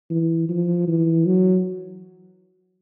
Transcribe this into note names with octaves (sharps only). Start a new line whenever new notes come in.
E3
F3
E3
F#3